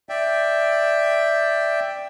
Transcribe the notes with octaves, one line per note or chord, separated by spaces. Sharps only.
D5 E5 G5